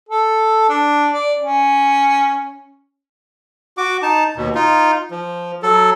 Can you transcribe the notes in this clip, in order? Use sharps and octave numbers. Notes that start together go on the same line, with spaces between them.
A4
D4
D5
C#4
F#4 D6
D#4 A5
D#2 B2
D#4 F4
F3
F#3 A4